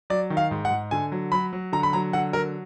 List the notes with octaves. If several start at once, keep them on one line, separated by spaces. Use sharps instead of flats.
F#3 D5
D#3
F5
G#2
F#5
G#2
D3 G#5
F#3
F#3 B5
F#3
D3 A#5
B5
F#3 A#5
D3 F#5
F#3 A#4